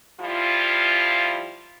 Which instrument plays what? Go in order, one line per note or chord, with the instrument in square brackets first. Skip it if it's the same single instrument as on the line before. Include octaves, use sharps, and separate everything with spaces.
[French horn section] F3 G3 E4 F4